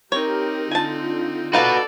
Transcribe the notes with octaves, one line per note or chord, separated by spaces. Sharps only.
C4 D#4 G4 A#4 C#5
D3 F4 G#5 A5
D#4 F#4 A4 B4 D5 F5 A5